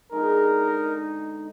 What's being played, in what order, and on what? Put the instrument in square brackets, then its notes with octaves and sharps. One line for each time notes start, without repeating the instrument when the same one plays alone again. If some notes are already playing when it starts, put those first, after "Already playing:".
[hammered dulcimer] B2 D3 G#3 [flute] D#4 [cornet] A#4